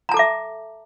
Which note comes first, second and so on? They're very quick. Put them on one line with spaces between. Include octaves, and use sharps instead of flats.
A#5 A5 A4 D6 E5